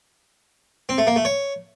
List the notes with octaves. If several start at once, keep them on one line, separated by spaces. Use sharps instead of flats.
C4
A3
A#3
A3
C#5